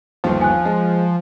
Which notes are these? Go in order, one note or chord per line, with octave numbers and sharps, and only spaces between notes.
G1 D#2 F3
G#5 F#6
G#3